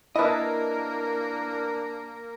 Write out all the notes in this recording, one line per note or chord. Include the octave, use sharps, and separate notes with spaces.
A#3 D4 E4 A#4 B4 D#5 A5